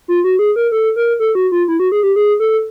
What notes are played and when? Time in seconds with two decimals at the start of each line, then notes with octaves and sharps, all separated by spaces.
0.08 F4
0.24 F#4
0.39 G#4
0.56 A#4
0.72 A4
0.96 A#4
1.20 A4
1.35 F#4
1.52 F4
1.68 E4
1.80 F#4
1.92 G#4
2.03 G4
2.16 G#4
2.40 A4